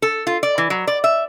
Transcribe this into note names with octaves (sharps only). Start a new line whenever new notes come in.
A4
F4
D5
E3
F#3
D5
E5